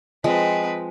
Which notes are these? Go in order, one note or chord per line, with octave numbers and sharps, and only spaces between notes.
F3 G#3 C4 B4 D#5